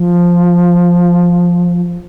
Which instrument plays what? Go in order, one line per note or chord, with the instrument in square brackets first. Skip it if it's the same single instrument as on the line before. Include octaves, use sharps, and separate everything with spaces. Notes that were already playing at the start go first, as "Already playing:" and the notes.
Already playing: [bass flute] F3